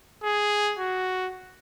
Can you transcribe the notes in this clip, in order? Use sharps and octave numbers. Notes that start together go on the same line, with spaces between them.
G#4
F#4